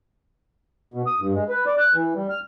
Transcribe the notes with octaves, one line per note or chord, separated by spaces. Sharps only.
B2
D#6
G2
G#3
B4
D5
F#6
E3
G3
F6